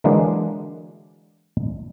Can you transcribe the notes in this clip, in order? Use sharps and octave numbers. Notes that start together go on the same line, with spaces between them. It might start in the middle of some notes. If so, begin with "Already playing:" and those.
D3 E3 F#3 G#3 A#3 D4